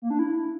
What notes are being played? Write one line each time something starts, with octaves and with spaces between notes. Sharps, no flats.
A#3
D4
E4